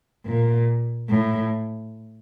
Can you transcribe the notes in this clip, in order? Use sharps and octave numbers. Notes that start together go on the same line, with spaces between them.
A#2
A2